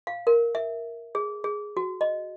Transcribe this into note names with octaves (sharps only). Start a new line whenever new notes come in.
F5
A#4
E5
G#4
G#4
F#4
D#5